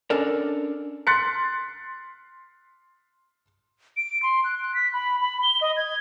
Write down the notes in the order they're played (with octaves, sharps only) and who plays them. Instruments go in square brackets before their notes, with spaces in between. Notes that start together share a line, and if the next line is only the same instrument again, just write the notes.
[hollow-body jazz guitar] C#4 D4 A4 A#4 D5
[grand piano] C6 F#6 A6 B6 C#7
[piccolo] D7
C6
F#6
F#6
B6
B5
B5
G7
D#5
G#6